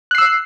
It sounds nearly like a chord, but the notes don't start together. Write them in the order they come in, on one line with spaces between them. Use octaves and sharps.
F#6 C7 E6